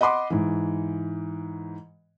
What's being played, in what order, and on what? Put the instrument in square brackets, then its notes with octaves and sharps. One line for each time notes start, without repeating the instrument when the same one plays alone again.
[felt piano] D#5 F#5 B5 C6 D6
G#2 E3